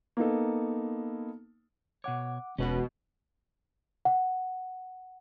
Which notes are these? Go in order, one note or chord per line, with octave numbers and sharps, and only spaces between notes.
A#3 B3 D#4 A4
B2 C#5 F#5 D6
E1 B2 G#3 B3 C#4 F#4 B4
F#5